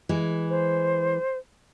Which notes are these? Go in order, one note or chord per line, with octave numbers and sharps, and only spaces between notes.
E3 G#3
C5